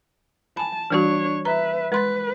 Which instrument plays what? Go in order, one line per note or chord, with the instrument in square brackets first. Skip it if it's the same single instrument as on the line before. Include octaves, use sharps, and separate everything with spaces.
[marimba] G#5 B5 [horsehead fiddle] A5
[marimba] E3 G3 F#4 [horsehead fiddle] D4 C#5
[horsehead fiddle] B4 E5 [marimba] A#5
[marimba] G#3 C6 A6 [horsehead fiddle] B4